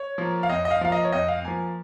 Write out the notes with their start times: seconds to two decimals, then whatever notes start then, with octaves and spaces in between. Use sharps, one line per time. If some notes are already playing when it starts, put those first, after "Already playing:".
Already playing: C#5
0.18 F3 A#3
0.43 F5
0.49 F2 D#5
0.65 D#5
0.71 F5
0.81 F3 A#3 F5
0.92 D#5
1.05 C#5
1.12 F2 D#5
1.28 F5
1.44 F3 A#3 G#5